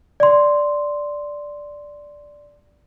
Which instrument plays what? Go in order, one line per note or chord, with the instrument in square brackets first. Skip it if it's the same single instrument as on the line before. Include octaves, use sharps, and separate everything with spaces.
[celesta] D5 C6